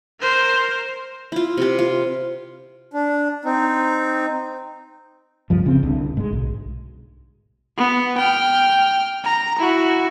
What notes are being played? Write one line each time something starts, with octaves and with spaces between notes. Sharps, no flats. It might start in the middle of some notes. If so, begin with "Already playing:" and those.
A#4 C5
E4 F4
C3 G4
F4
D4
C4 D#4
C#2 G2 F3
D1 C#3 C4
C2 D3
G#2 G#3
B1
B3
G5 F6
A#5
E4 F#4